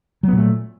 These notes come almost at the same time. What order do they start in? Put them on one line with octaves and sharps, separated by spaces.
F#3 B3 A#2 A3